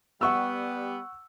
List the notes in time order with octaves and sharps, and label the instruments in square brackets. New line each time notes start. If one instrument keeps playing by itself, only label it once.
[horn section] G3 B3 [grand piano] F#5 C#6 E6